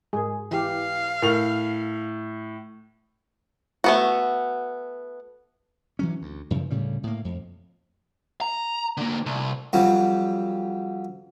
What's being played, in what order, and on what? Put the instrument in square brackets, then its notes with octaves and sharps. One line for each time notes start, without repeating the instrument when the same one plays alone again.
[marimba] G#2 A#4 [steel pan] G#3 G#4
[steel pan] E3 G4 [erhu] F5
[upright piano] A2 F7 [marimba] A#4 C#6 F6
[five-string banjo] A3 B3 F#4
[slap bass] E3 F#3 C#4
D2
F#2 C#3 E3 F3
D2 A2 C#3 G3
A2 A#3
F2
[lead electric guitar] A#5
D3 A#3
C2
[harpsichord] F2 F#3 G3